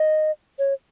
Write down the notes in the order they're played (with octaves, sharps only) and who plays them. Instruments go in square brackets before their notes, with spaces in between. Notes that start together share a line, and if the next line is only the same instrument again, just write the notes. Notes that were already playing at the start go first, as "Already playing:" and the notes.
Already playing: [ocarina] D#5
C#5